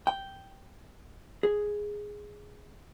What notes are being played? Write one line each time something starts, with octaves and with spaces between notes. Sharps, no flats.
G5
G#4